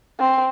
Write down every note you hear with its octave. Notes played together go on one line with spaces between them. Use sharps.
C4